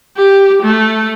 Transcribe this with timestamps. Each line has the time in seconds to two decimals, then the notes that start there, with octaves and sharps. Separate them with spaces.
0.17 G4
0.62 A3